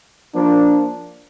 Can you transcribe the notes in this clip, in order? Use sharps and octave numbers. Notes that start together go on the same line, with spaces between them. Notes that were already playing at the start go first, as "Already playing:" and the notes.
F3 A#3 D4